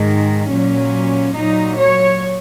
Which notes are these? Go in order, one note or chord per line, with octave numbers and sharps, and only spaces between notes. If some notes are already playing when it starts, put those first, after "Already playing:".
Already playing: G#2 D#3 G#3
A#2 F#3 C#4
A#2 F#3 D#4
C#5